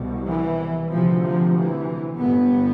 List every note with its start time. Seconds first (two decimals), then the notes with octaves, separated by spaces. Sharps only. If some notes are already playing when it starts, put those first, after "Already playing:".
Already playing: C2 B2
0.29 E3
0.92 D2 C3 F3
1.24 F3
1.56 E3
2.19 G1 G2 B3